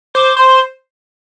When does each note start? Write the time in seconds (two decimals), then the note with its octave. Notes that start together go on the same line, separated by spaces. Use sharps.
0.15 C5 D6
0.37 C5 C6